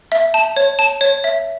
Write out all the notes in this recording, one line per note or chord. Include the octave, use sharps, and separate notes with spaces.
E5
A5
C#5
A5
C#5
E5